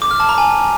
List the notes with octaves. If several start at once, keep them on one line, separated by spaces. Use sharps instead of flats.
D6
F6
A5
A#5
G#5